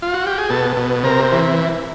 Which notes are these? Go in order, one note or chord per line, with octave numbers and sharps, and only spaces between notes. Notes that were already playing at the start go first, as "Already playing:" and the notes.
F4
F#4
G4
G#4
B2 A4
B2
C3 A#4
E3